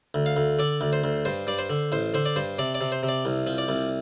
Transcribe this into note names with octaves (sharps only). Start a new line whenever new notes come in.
D2
F5
D2
D3 D5
D2
C5
D2
G2 C5
G2 D5
C5
D3
A1 C5
D3 C5
D5
G2 C5
C3 D5
D5
C3
C5
C3
D5
C2
F3
D5
C2